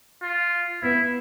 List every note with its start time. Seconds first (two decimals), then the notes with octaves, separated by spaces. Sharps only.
0.23 F4
0.83 B3 E4